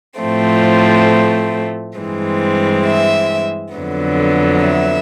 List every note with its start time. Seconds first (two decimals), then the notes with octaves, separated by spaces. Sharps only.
0.20 A2 F3 A3 C4
1.97 G2 E3 G#3 C4
2.86 E5
3.73 F2 D3 F#3 B3
4.63 E5